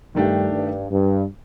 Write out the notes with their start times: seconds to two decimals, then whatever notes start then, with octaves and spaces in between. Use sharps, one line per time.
0.15 G2 D#3 A3 D4 G4
0.52 G2
0.91 G2